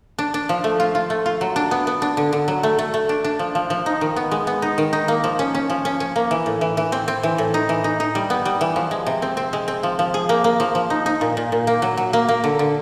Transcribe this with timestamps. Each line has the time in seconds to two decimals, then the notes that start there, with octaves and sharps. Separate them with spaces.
0.19 D4
0.34 D4
0.49 F3
0.64 A3
0.80 F4
0.95 F4
1.10 A3
1.26 F4
1.41 F#3
1.56 D4
1.71 B3
1.87 B3
2.02 D4
2.17 D3
2.33 D3
2.48 F#3
2.63 A3
2.79 A3
2.94 A3
3.09 D4
3.24 D4
3.39 F3
3.55 F3
3.70 F3
3.86 D#4
4.01 D#3
4.16 B3
4.31 G#3
4.47 B3
4.62 D#4
4.78 D#3
4.93 D#4
5.08 A#3
5.24 F3
5.39 C#4
5.55 C#4
5.70 F3
5.85 C#4
6.00 C#4
6.16 A#3
6.31 E3
6.46 A2
6.61 E3
6.77 E3
6.92 C4
7.08 C4
7.23 E3
7.38 A2
7.54 D#4
7.69 E3
7.84 D#4
8.00 D#4
8.15 G3
8.30 B3
8.45 G3
8.61 E3
8.76 F3
8.91 G#3
9.06 C3
9.22 C4
9.37 C4
9.53 G#3
9.68 C4
9.83 F3
9.99 F3
10.14 G#4
10.29 A#3
10.44 A#3
10.60 F3
10.75 F3
10.90 D#4
11.06 D#4
11.21 A#2
11.37 A#2
11.52 A#2
11.67 A#3
11.82 F#3
11.97 F#3
12.13 A#3
12.29 A#3
12.44 D3
12.59 D3